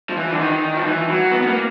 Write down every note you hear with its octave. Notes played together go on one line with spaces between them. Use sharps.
F3
E3
D3
D#3
F3
E3
F#3
B3
B3
A#3